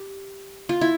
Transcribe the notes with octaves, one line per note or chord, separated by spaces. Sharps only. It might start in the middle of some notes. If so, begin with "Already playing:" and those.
Already playing: G4
F4
E4